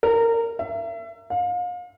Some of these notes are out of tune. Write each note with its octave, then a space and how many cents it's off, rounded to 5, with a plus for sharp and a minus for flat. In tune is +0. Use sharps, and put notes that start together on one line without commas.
A#4 -20
E5 +30
F5 +35